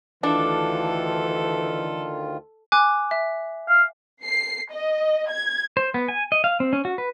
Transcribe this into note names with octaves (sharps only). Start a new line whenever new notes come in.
D2 D#3 E3 D4 F4 A4
G#5 D6 F#6
E5
F5
C7
D#5
G#6
C5
B3
G#5
D#5
F5
C4
C#4
F#4
B4